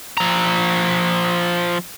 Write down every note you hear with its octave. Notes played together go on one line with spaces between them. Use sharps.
F3 A#5